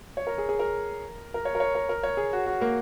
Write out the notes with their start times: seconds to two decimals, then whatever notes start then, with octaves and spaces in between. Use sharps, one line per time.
0.17 C#5
0.27 A#4
0.38 G#4
0.49 G#4
0.59 A#4
1.34 A#4
1.45 C#5
1.55 A#4
1.60 C#5
1.75 A#4
1.89 A#4
2.03 C#5
2.17 G#4
2.33 F#4
2.46 F#4
2.61 A#3